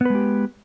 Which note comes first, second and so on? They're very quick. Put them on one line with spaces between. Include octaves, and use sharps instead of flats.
B3 B4 G#3 G4